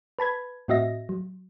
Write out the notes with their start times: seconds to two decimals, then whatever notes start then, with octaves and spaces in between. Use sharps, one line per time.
0.19 B4 A5 B5 G#6
0.68 A2 C4 F#4 D#5 E5 A#6
1.09 F#3